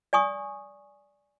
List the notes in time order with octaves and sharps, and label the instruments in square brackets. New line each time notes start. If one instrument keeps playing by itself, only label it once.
[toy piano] D5 G#5 C#6 D#6